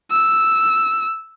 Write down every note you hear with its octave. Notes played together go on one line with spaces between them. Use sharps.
E6